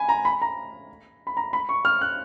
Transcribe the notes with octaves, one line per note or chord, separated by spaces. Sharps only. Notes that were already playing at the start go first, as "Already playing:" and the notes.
Already playing: G#5 B5
A#5
B5
A#5
B5
A#5
B5
C#6
F6
F#6